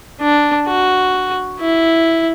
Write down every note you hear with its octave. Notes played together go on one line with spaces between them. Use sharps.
D4
F#4
E4